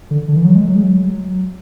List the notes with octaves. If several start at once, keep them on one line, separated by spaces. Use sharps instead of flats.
D3
D3
E3
F#3
G#3
F#3
G#3
F#3